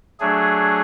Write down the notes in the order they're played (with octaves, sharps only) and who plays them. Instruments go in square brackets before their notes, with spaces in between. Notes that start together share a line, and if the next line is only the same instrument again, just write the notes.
[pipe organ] F#3 A3 D4 G#4